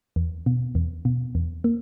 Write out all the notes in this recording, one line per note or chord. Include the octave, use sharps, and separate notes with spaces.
E2
B2
E2
B2
E2
A#3